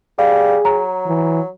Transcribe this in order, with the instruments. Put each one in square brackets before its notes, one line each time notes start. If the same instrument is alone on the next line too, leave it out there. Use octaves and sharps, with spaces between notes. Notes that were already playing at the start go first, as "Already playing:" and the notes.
[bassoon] G3 [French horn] G#4 [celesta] F5
[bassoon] F#3 [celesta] A#5
[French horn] E3